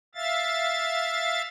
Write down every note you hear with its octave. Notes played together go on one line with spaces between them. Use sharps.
E5 F5 A6